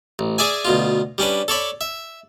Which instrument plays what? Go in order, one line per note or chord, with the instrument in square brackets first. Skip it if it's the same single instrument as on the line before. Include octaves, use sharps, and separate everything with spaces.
[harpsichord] A1
G#4 D5 E5 G#5
D2 B2 F4
G3 C#4 D4 B4
A4 C#5 D5 B5
E5